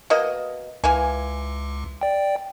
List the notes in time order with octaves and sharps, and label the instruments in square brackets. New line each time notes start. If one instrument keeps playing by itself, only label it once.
[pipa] B2 A#3 D#5
[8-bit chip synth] C#2 [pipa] E3 A#3 G#5
[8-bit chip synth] D5 G5